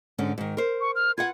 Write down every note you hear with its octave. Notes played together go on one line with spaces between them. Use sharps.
G#2 D3 C#4
G#2 D#3
A#4 C5
C#6
F6
F4 B4 F#5 G#6